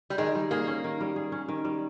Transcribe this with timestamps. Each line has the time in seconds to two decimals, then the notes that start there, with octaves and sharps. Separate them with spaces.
0.10 G3
0.18 D#3 G#3
0.35 G3
0.51 A#3 G#4
0.67 C#4
0.84 D#3
1.01 G3
1.16 G#4
1.32 C#4
1.49 D#3
1.64 G3